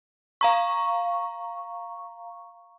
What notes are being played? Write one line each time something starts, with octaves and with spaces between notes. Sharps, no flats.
F5 A#5 C#6